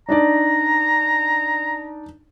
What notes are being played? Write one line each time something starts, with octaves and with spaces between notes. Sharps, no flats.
D4 D#4 D5 A#5